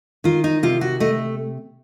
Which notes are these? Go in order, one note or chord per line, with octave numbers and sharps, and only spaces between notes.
D#3 F4
D#4
C3 F4
F#4
A3 D#5